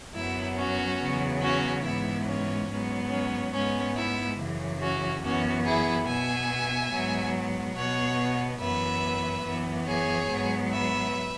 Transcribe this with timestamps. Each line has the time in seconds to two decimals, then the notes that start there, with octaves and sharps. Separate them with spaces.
0.15 F#2 F#3 B3 E4
0.57 C#4 F#4
1.00 E2 C#3 F#3 B3
1.42 C#4 F#4
1.83 G#2 E3 B3 E4
2.26 C#4
2.69 G#2 F#3 B3
3.11 C#4
3.53 G#2 G#3 B3 C#4
3.96 E4
4.38 F#2 C#3 E3
4.80 C#4 F#4
5.22 F#2 E3 B3 C#4 F#4
5.65 E4 G#4
6.06 B2 B3 E5 G#5
6.91 G#2 F#3 B3
7.75 B2 B3 C#5 F#5
8.60 F#2 E3 B3 B4 E5
9.45 F#2 E3 B3
9.87 G#4 C#5
10.30 G#2 F#3 B3
10.71 B4 E5